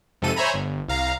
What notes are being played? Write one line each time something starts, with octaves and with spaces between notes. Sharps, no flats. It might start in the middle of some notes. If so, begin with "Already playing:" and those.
F2 G#2 C3 A4 D#7
C5 C#5 E5 G#5 A#5 B5
G1
C2 F5 A#5